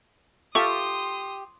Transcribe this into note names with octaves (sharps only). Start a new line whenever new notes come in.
F4 G4 A4 E5 C6 C#6 D#6